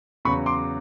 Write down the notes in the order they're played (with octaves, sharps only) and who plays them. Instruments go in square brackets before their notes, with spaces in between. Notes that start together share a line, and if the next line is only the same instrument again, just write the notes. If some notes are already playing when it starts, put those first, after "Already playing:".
[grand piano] E2 C#3 F#3 B5 C#6
C6 D6